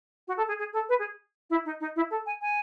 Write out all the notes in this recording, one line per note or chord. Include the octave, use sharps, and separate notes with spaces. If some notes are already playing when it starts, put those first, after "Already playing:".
F#4
A4
G#4
G#4
A4
B4
G#4
E4
D#4
D#4
E4
A4
G#5
G#5